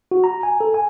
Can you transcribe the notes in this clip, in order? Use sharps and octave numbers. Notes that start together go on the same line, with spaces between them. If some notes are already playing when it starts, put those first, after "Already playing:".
F#4
A#5
G#5
A4
G#5